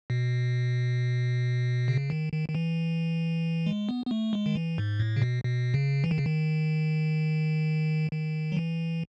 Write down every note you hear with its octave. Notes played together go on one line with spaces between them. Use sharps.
B2
C#3
D#3
D#3
D#3
E3
G#3
B3
B3
A3
G#3
D#3
E3
G#2
A2
C#3
B2
B2
C#3
E3
D#3
C#3
D#3
D#3
F#3
E3